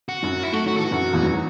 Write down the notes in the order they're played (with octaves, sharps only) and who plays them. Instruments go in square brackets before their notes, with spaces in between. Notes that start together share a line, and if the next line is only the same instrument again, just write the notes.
[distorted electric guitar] F#4
[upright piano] F#2 F#3
[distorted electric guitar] E4
[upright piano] A3 [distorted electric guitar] F#4
[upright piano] F#3 [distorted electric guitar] F#4
[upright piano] E3 [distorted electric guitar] A4
[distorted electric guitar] F#4
[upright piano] F#2 F#3
E2 E3
F#2 F#3
F#3